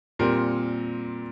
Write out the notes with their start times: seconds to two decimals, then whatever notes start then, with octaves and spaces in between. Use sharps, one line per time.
0.19 A#2 G3 C4 A#4